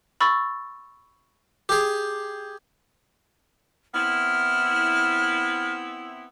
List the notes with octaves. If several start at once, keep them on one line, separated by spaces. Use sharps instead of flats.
B5 C#6 E6 A6
G4 G#4
B3 C4 E4 F6